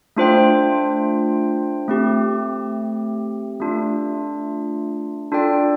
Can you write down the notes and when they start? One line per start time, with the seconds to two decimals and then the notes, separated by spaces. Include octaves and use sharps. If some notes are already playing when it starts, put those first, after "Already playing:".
0.16 A3 D4 F4 C5 G5
1.88 A3 C4 G4
3.60 A3 D4 F4
5.32 D4 F4 A4 D5 G5